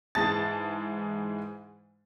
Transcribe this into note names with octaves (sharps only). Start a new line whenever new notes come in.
G#2 E3 G#3 A5 A6